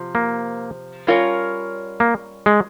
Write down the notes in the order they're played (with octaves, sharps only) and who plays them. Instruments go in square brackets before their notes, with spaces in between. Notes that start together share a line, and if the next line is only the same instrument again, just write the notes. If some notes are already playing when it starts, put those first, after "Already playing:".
Already playing: [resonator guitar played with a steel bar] C3 F3
[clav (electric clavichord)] A#3
[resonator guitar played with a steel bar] G3 C#4 F4 A#4 C#5
[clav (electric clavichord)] A#3
G#3